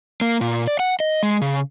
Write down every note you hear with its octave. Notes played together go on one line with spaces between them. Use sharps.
A#3
A#2
D5
F#5
D#5
G#3
C#3